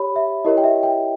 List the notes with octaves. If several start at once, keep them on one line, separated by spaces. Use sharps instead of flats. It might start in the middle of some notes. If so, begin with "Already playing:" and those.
Already playing: G4 C#5 B5
E5
E4 G4 A#4 C#5 D#5
G5
E5
G5